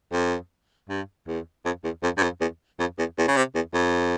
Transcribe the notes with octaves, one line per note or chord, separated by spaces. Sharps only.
F2
G2
E2
F2
E2
F2
G2
F2
E2
F2
E2
E2
C#3
C3
E2
F2